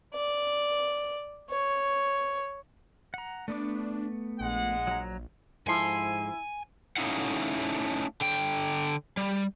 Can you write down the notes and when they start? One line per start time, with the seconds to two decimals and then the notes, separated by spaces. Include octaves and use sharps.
0.15 D5
1.51 C#5
3.14 F#5 A#5
3.48 A3 B3 D4 D6
4.40 A#1 G#3 F#5
4.87 F#3 A#5
5.67 G#2 F3 E4 A4 G#5 C6
6.97 A3 C#4 D#4 E4 F5 F#5
8.21 D3 G5
9.17 G3